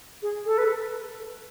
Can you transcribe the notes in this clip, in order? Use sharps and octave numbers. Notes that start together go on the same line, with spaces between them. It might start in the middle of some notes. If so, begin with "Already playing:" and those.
G#4
A4
B4